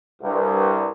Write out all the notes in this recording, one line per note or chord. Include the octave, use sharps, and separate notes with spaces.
C2 G2